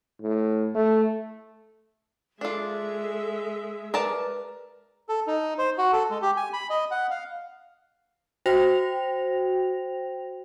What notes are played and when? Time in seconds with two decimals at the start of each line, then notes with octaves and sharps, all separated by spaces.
0.21 A2
0.75 A3
2.41 G#3 D4 F4 A4 E5
3.94 A#4 B4 D5 A5
5.09 A4
5.27 D#4
5.58 C5
5.78 F#4
5.92 A4
6.10 G#3
6.22 G4
6.37 G#5
6.53 B5
6.70 D#5
6.91 F#5
7.10 F5
8.46 F#4 C5 G5 A#6 F7